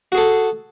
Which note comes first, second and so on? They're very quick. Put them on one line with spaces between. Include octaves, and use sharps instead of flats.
F#4 G#4 A4